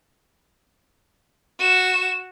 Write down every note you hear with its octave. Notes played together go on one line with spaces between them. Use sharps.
F#4 E7